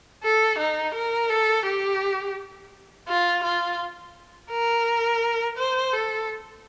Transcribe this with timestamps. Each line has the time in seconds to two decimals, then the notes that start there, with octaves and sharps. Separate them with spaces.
0.23 A4
0.58 D#4
0.95 A#4
1.30 A4
1.66 G4
3.08 F4
3.43 F4
4.51 A#4
5.58 C5
5.93 A4